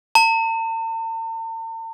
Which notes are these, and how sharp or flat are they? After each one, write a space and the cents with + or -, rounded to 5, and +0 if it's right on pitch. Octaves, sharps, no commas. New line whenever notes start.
A5 +45